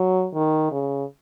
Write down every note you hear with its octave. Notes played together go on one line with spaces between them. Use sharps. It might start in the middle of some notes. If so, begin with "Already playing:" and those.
Already playing: F#3
D#3
C#3